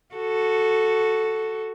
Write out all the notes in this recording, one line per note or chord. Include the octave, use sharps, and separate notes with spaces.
F#4 A4